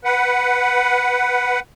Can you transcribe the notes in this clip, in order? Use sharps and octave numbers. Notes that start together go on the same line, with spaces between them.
B4 F#5